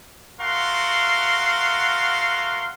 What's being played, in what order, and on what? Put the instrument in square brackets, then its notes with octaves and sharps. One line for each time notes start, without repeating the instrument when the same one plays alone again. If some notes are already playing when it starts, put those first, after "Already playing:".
[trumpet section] A3 F#4 A#4 F5 F#5 C6